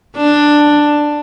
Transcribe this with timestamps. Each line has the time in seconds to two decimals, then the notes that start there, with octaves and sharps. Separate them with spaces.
0.17 D4